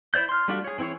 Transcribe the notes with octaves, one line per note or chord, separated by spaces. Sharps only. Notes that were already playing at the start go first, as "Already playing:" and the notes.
E4 C5 D5 G6
C6 F6
G3 A3 D4 F4 F#4
G#4 C#5
E3 C4 E4 G#4 C#5